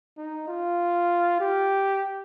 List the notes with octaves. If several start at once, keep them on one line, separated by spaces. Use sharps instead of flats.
D#4
F4
G4